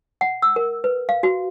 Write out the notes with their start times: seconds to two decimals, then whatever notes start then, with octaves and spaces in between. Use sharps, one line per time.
0.21 F#5
0.42 E6
0.56 A#4
0.84 B4
1.09 F5
1.23 F#4